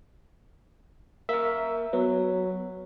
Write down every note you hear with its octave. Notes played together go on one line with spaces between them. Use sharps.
A#3 A#4 E5
F#3 B3